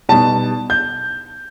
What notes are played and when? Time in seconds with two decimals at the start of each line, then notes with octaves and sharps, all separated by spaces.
0.09 B2 G3 B3 D#4 A5
0.70 G6